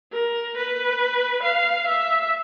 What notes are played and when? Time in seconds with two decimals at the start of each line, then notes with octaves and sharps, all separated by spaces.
0.12 A#4
0.57 B4
1.43 F5
1.87 E5